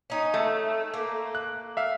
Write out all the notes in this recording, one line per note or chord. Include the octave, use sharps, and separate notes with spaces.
C#4 D#4
A3
A#3
F#6
E5 F5